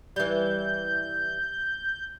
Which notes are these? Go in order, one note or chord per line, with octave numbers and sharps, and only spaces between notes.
E3 G3 G6